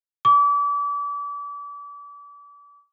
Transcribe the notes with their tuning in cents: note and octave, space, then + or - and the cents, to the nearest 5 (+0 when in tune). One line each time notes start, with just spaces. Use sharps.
D6 -35